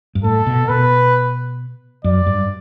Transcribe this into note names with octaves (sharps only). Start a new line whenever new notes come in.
G2
A2 A4
B2
B2 B4
F#2 D5
G2